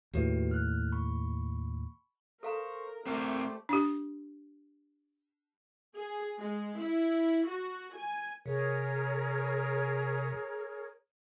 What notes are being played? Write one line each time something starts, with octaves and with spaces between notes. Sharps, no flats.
D#2 A2 F#4 G4 B4
F6 F#6
B5 C#6
A4 A#4 C5 F5 A#5 C#6
A3 C4 G4 A#4 C5 D5
D4 G4
G#4
G#3
E4
F#4
G#5
C3 G#4 A#4 C#5